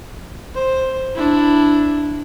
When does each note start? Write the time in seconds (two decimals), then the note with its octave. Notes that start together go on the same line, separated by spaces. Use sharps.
0.54 C5
1.15 D4 E4